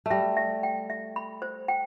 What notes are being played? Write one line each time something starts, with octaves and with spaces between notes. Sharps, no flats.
G3 A3 E5
E5
G5
E5
B5
C5
G5